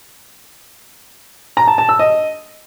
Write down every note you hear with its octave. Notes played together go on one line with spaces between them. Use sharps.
A#5
A5
A5
E6
D#5